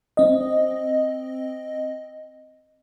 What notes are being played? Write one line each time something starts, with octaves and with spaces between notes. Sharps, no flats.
C4 D#5